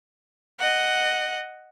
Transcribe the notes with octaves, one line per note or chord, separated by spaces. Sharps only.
D#5 F#5